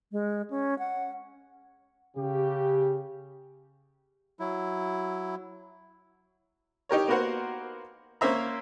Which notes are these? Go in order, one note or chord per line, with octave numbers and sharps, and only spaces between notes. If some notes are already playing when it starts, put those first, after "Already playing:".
G#3
C#4
F#5
C#3 G4
F#3 E4
D#4 G4 A#4 C#5
A#3 B3 F#4 A#4 C5 F#5
A#3 C#4 A#4 C5 E5 A#5